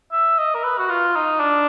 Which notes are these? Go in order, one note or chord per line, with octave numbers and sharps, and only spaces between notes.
E5
D#5
A#4
B4
F#4
F4
D#4
D4